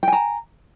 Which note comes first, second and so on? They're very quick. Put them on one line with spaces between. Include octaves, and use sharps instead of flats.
G5 G#5 A#5